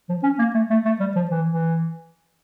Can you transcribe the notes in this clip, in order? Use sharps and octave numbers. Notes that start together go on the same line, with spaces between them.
F3
C#4
A#3
A3
A3
A3
G3
F3
E3
E3